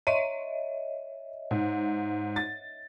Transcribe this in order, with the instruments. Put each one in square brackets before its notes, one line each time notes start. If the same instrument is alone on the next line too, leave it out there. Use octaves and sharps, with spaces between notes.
[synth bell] C#5 D#5 E5 [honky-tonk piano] D#7
[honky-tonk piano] G#2
A6